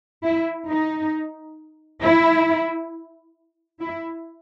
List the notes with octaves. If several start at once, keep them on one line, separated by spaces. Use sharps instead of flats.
E4
D#4
E4
E4